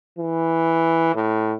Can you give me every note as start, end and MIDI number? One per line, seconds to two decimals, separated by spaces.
0.18 1.14 52
1.15 1.56 45